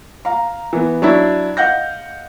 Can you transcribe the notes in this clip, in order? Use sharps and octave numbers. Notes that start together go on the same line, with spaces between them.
F5 A#5
E3 B3
F#3 D4 E4
D#5 F5 F#5 F#6 G6 A#6